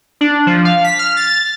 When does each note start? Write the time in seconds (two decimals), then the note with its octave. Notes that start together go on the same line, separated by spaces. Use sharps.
0.21 D4
0.47 F3
0.65 F5
0.84 B6
0.99 F6
1.17 A6